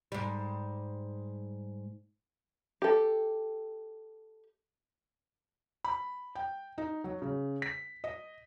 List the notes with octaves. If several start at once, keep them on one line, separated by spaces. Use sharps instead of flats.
G#2 G3
G4 A4
B5
G5
D#4
F#3
C#3
B6
D#5